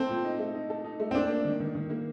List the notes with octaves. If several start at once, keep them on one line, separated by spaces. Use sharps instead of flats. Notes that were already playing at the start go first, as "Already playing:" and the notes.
Already playing: A3 C4 A4
A#2
D#4
A3
D#4
A4
D#4
A3
C4
A#3 D4
A#3
D#3
D#3
D#3
A#3